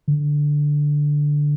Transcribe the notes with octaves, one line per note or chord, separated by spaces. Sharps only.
D3